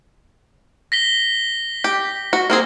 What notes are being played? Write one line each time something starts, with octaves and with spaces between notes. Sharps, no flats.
A#6 B6 G7
G4
F#4
A#3 C4 G#4